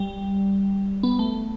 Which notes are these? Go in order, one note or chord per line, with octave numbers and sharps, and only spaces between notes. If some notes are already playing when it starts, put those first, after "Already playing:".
Already playing: G3
B3
A3